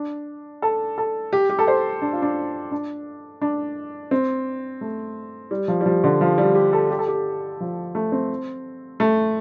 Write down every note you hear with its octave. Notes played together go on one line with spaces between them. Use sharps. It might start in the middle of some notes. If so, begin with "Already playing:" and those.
Already playing: D4
A4
A4
G4
G4
A4
C5
D4
F4
D4
D4
D4
C4
A3
G3
F3
G3
F3
D3
F3
G3
G4
A4
G4
A4
G4
F3
A3
C4
A3